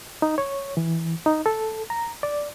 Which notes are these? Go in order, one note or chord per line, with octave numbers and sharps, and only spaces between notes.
D#4
C#5
E3
D#4
A4
A#5
D5